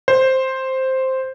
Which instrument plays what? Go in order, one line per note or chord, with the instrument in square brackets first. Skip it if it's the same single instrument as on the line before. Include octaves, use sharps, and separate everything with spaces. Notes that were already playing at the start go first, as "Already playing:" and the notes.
[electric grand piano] C5